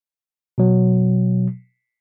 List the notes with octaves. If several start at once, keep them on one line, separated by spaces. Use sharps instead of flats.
B2 F#3